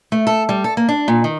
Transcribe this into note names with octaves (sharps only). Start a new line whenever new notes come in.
A3
A4
G3
A4
A#3
D4
A#2
D#3